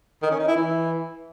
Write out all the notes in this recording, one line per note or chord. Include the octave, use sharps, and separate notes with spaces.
D#3
C#4
D#4
E4
E3